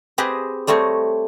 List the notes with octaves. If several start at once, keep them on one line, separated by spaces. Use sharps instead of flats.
C4 G4 G#4 B4 D#5
G3 A3 C4 C#5 D#5